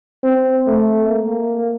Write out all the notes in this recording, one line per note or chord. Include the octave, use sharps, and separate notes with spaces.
C4
A3
A#3